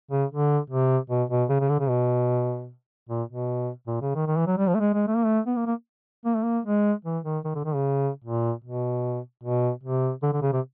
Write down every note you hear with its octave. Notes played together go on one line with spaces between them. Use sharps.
C#3
D3
C3
B2
B2
C#3
C#3
D3
C#3
B2
A#2
B2
A#2
C#3
D#3
D#3
E3
F#3
G3
F3
A3
G#3
G#3
A3
A#3
A3
B3
A#3
A#3
A#3
A3
A#3
G#3
E3
D#3
D#3
D3
D#3
C#3
A#2
B2
B2
C3
D3
D3
C#3
C3